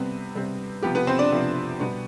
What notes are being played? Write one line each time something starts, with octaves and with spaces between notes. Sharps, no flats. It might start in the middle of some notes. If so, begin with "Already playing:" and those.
Already playing: C3 G3 B3 C4 B4
C3 G3 C4
C3 F3 B3 G4
B3 B4
C4 C5
D4 D5
C3 F3 B3
B2 G3 B3